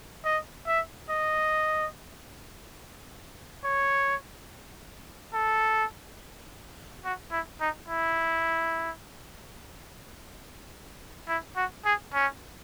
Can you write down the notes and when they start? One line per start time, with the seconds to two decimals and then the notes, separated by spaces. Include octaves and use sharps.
0.25 D#5
0.67 E5
1.10 D#5
3.64 C#5
5.34 A4
7.05 F#4
7.32 E4
7.61 D#4
7.89 E4
11.29 E4
11.56 F#4
11.85 G#4
12.14 C#4